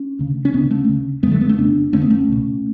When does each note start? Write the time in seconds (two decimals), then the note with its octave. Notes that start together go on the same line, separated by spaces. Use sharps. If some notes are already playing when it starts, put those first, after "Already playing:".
Already playing: C#4
0.19 D2 C#3
0.45 C#4
0.53 D2 C#3 B3 D4
0.71 A3 C#4
0.88 D2 C#3
1.23 F#2 G#3 B3
1.27 D3 F#3 A3
1.41 G#3 B3
1.49 A3 C#4
1.57 F2 C#3 B3 D4
1.92 F2 D3 A3 C#4
2.02 B3
2.10 A3 C#4
2.28 C#2 B2